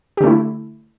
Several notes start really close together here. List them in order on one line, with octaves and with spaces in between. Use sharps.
G4 D3 A3 E4